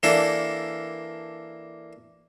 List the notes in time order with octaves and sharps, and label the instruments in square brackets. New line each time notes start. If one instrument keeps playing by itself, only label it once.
[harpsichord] E3 A#3 D4 A4